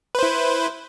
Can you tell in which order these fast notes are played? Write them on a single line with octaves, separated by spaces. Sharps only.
B4 C5 E4